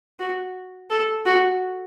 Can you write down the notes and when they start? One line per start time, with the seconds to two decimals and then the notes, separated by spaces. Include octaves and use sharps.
0.19 F#4
0.90 A4
1.26 F#4